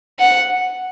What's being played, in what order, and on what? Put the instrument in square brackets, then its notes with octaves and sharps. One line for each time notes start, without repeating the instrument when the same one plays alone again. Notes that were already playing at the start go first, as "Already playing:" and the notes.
[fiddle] F#5